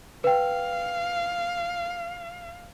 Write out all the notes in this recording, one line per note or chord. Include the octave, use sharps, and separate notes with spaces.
B4 F5 G5